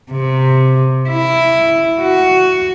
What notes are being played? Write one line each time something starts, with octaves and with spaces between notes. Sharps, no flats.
C3
E4
F#4